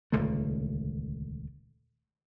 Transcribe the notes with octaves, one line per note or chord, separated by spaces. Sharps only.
D#1 C#2 D3 A3